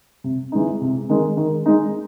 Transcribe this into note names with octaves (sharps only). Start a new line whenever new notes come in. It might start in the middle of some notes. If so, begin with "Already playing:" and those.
C3
E3 G#3 D#4
C3
D#3 G#3
D#3
G#3 D#4